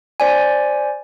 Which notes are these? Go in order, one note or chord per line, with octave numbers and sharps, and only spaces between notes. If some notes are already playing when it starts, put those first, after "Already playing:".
C5 D5 G#5